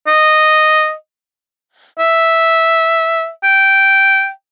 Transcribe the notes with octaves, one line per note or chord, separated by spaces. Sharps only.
D#5
E5
G5